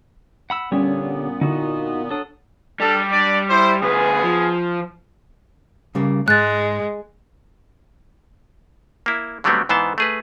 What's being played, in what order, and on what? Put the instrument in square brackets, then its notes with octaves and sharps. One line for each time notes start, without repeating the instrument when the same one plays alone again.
[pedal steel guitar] F#5 B5 E6
[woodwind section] A#2 B3 [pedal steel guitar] D3 G4 C#5 [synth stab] G3 C#4
[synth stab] D3 E4 [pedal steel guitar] D#4 F#4
[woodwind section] F#3 D4 [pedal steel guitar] A4 D#6
[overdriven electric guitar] G3 [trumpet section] D4 A4
[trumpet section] D4 D5
E4 C5
[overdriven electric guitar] D2 B4 [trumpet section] B3 G#4
[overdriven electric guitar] F3
[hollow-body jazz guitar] C#3 G3 A#3
[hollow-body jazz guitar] G#2 [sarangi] G#3 [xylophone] F#6 A6
[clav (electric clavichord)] A#3 E4
D3 F#3 G3 A3 B3 C4
G#2 E3 B3 C5 A5
A3 G#4 B4